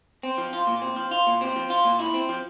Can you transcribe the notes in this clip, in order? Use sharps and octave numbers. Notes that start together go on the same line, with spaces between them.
C4
F3
F4
A#2
C4
F3
F4
A#2
C4
F3
F4
A#2
E4
C4
F3